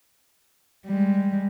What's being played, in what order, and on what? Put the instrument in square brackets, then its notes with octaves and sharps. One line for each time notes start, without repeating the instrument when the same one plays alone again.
[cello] G3 G#3